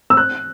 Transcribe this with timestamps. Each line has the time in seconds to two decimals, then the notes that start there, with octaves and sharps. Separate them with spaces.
0.10 E6
0.17 F#6